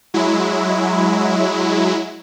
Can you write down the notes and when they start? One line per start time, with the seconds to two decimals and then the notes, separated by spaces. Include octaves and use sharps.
0.14 F#3 G#3 E4